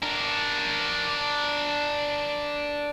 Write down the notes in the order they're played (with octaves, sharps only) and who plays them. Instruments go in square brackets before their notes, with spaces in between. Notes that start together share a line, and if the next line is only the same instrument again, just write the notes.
[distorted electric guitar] D4 A#4